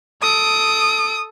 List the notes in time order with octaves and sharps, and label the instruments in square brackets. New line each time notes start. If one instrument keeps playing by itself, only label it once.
[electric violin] A4 D7 [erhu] D#6